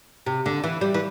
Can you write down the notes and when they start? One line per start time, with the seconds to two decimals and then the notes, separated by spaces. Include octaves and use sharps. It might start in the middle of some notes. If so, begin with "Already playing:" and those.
0.26 C3
0.46 D3
0.64 E3
0.81 G3
0.94 E3